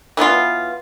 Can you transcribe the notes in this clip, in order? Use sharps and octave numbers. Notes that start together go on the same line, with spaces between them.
E3 F#3 B3 F4